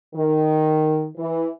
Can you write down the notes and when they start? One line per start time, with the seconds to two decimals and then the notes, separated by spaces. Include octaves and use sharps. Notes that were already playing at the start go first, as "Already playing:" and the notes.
0.15 D#3
1.17 E3